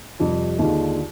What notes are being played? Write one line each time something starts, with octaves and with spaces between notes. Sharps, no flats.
F2 C3 G3
D#2 D3 G#3 D4 F4